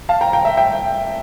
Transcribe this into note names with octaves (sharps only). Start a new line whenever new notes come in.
F5 A5
G5 A#5
G5 A#5
E5
E5 G5